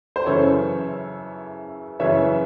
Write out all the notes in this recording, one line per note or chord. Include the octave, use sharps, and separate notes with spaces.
C5
F#2 C#3 E3 A4 C#5
F#2 C#3 E3 C#5 E5